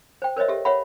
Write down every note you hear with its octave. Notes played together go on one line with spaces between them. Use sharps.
C5 G5
A#4 C5 C#5 D#5 E5
G4 A4 E5
B4 C#5 E5 F#5 B5